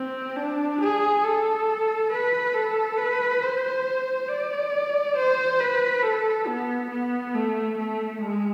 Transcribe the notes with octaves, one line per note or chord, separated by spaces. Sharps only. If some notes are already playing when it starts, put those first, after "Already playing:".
Already playing: C4
D4
G#4
A4
B4
A4
B4
C5
D5
C5
B4
A4
B3
B3
A3
A3
G#3